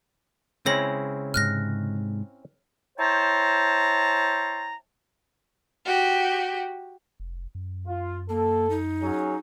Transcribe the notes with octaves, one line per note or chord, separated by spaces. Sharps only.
C#3 G#3 C4 C#4 E4 C#5 A#6 F#7
G#2 C3 F6 F#6 A#6
E4 C5 C#5 G5 A5 A#5
F#4 G4
F1
F#2
F4
A#3 A4
D#4
F#3 C#4 G#4